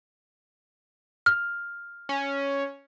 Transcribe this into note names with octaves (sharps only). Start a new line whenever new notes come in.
F6
C#4